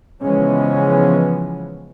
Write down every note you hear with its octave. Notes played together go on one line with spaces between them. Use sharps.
C#3 E3 F3 G#3 B3 C#4